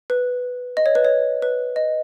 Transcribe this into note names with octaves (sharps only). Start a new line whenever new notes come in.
B4
D#5
C#5
B4
C#5
B4
D#5